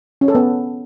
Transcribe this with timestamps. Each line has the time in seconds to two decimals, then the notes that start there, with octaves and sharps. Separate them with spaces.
0.21 C#4
0.28 A4
0.35 B3